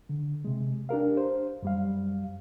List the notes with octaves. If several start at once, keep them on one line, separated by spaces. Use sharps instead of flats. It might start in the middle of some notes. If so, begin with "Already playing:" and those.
D3
C3 G#3
D4 G4 A#4 F5
C5
F#2 G3 F5